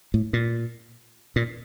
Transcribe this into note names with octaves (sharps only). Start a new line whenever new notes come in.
A2
A#2
A#2